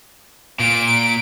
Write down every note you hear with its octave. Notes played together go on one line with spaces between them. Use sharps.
A#2 D7